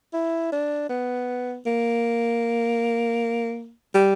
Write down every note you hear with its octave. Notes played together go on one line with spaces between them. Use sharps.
E4
D4
B3
A#3
G3